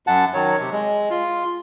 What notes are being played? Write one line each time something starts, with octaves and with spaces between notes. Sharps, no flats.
F#2 F#5 A5
D#3 F#3 C#5
C3
G#3
F4